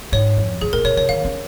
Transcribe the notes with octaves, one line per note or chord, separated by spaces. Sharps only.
G#2 C#5
F2
G#2 G#4
A#2 A#4
A#2 C#5
C#3 C#5
D#3 F5
C#4